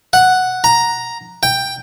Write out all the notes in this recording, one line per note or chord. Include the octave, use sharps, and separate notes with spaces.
F#5
A#5
G5